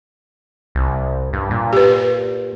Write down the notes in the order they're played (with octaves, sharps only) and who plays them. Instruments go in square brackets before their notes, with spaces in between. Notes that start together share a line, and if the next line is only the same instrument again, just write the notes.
[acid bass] C2
G2
A#2
[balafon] G4 B4